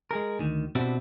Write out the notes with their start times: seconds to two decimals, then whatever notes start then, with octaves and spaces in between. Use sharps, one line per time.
0.11 G#3 G#4 A#4
0.39 D2 D#3
0.75 B2 C4 D4 E4 F#4 G4